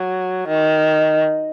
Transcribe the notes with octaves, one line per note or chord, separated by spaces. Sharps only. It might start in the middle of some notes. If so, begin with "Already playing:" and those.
Already playing: F#3
D#3